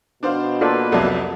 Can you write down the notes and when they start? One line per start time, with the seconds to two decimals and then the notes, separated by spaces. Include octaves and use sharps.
0.23 B2 D4 C5 F5
0.61 A#3 F4 A4 B4 D5
0.92 C2 F2 F#3 A4 D5 E5